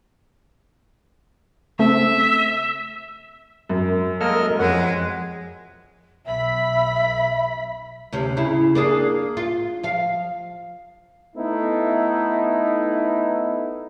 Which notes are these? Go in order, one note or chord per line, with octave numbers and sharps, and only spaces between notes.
C#3 A3 C4 E5
F#2
G#3 A#3 A4 A#4 D#5 F6
F2 G#3 C#5 F#5
B1 E5 B5 B6
D2 C3 C#4
C#3 E4
A#3 D4 G#4
F4
F3 F5
A3 B3 D#4 E4